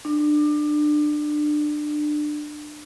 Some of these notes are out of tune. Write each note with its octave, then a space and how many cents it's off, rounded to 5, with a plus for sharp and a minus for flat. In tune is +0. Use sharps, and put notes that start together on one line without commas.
D4 +25